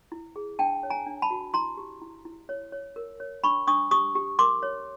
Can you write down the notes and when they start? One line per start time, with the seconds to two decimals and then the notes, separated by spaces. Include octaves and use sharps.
0.12 E4
0.36 G#4
0.59 D4 G5 A5
0.83 C#5
0.90 G#5 A#5
1.06 D4
1.22 A5 B5
1.30 F#4
1.54 E4 A#5 C6
1.77 G4
2.02 E4
2.25 E4
2.49 C#5
2.72 C#5
2.96 A#4
3.20 C#5
3.44 D4 B5 C#6
3.67 D4 C#6 D#6
3.91 G4 C#6 D#6
4.15 G4
4.39 A#4 C6 D6
4.63 C#5